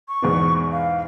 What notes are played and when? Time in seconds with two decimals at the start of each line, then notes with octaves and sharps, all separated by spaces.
0.09 C#6
0.22 E2 G#2 B2
0.72 F5